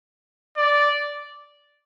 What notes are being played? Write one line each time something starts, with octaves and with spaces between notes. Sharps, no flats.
D5